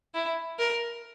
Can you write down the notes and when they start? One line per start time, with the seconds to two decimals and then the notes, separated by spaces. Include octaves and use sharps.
0.15 E4
0.59 A#4